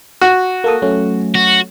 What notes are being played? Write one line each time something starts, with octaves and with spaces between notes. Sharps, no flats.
F#4
A#3 A4 D#6
F#3 A3 C#4
F#4